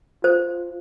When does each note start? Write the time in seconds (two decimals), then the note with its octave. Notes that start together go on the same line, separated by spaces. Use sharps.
0.24 F4 C5